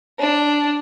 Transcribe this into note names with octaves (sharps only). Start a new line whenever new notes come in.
D4